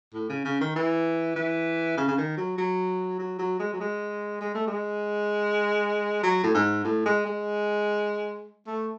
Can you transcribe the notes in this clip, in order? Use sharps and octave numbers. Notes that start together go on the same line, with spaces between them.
A2
C#3
C#3
D#3
E3
E3
C#3
C#3
D#3
F#3
F#3
F#3
F#3
G#3
F#3
G#3
G#3
A3
G#3
F#3
A2
G#2
A2
G#3
G#3
A3